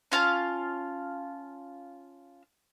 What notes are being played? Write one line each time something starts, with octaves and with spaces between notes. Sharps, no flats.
C#4 F4 F5 A5